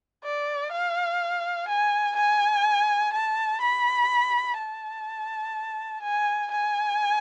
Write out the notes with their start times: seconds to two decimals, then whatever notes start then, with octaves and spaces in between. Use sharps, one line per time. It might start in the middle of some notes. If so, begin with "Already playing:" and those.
0.24 D5
0.72 F5
1.68 G#5
2.16 G#5
3.14 A5
3.62 B5
4.58 A5
6.03 G#5
6.52 G#5